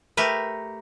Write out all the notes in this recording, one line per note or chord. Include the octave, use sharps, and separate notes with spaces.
A3 G4 A#4 B4